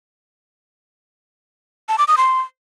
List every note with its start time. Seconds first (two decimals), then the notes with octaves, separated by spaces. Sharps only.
1.89 A5
1.98 D6
2.08 D#6
2.18 C6